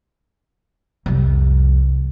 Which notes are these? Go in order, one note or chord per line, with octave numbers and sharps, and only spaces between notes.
C2 F2